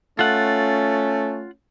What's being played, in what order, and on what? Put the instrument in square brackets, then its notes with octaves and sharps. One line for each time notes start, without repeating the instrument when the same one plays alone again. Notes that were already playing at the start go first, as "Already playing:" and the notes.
[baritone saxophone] A3 [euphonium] C#4 [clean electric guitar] F4 F#5